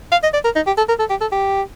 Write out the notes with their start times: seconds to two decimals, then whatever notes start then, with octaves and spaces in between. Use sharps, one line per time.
0.11 F5
0.23 D#5
0.33 D5
0.44 A#4
0.55 D#4
0.67 G4
0.77 A4
0.88 A#4
0.99 A4
1.10 G4
1.21 A4
1.32 G4